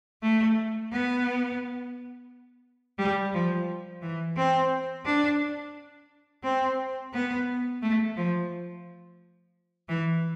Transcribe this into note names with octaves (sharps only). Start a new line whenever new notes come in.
A3
B3
G3
F3
E3
C4
D4
C4
B3
A3
F3
E3